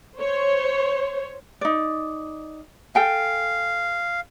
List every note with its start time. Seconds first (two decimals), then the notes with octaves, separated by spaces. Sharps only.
0.17 C5 C#5
1.61 D#4 D5
2.95 A4 F5 G5 G#5